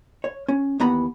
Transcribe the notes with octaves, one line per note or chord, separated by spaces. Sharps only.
C#5
C#4
D#2 E3 B3 F#5 A#5 B5